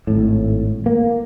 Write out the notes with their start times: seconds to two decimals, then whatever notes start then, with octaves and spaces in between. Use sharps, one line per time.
0.07 G#1 A2
0.86 A#3